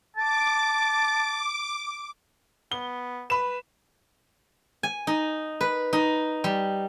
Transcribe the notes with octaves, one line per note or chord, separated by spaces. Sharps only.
A5 D6
B3 G7
B4 B5 E7
G#5
D#4
B4
D#4
G3